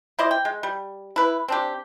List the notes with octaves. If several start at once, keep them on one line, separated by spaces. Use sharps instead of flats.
E4 C5 D5 D#5
G5
G#3
G3
E4 B4
C4 D4 G4